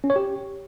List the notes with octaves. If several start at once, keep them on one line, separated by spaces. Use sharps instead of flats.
C#4
C#5
G4